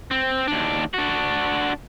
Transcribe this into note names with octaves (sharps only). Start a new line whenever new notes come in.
C4
D#2 D4
D4 F#4